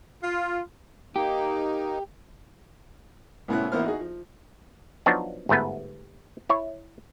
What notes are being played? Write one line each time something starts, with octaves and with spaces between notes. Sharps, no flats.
F4
A#3 D#4 G4
C2 A2 B3 C#4 E4 F#6
A1 A#3 B3 E4 C5 F6
D#4 F#4 G#4
F3
F3 F#3 B3 D4 D#4 F#4
G1 G#2 A3 B3 B4
E4 C#5